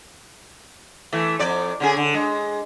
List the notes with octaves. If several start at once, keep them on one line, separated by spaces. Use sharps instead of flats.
E3 A3
F2 D5
D3 C#4 G#4
D3
G#3